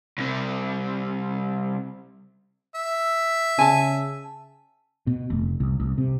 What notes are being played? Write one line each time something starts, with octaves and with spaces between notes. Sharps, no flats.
C2 C3
E5
C#3 G#5 A5
B2
F1
C2
C2
C3